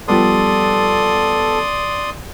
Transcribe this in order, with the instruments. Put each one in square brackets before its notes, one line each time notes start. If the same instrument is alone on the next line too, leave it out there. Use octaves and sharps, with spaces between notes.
[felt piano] F3 G3 B3 [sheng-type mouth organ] A4 [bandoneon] D5 C6 D#6